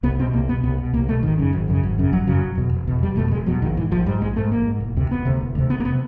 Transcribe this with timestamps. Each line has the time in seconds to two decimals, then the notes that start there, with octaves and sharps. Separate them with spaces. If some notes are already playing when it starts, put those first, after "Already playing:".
0.03 C2 B3
0.19 B2 C4
0.33 C2 A#3
0.49 B2 B3
0.63 C2 B3
0.78 B2
0.93 C2 A#3
1.08 B2 A3
1.23 G#1 D#3
1.38 F#2 C#3
1.53 G#1
1.68 F#2 C#3
1.83 G#1
1.98 F#2 C#3
2.12 G#1 F#3
2.27 F#2 C#3 F#3
2.42 E1
2.58 E2 B2
2.73 E1
2.87 E2 B2
3.02 E1 G3
3.17 E2 B2 A3
3.31 E1 G#3
3.46 E2 B2 F#3
3.62 A#1 D#3
3.77 G#2 E3
3.91 A#1 F3
4.06 G#2 G3
4.21 A#1 G#3
4.36 G#2 A3
4.52 A#1 A#3
4.66 G#2
4.80 E1
4.96 D2 C3
5.11 E1 B3
5.25 D2 C3
5.41 E1
5.55 D2 C3
5.70 E1 B3
5.80 A#3
5.85 B3
5.90 C3